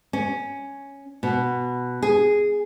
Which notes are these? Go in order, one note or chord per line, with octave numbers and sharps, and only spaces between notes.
C#4
B2
G#4